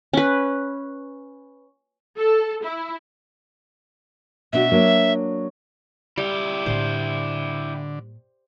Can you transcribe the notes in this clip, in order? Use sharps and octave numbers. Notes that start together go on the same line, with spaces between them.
C#4 B4
A4
E4
B2 D4 F#4 E5
F#3 A#3 D4
G3 E4 G4
A2 D3 A#3 C5